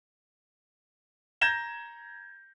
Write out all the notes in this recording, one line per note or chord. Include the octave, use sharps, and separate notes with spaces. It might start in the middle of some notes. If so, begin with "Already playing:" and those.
A#5 G6 G#6 A#6 E7 G7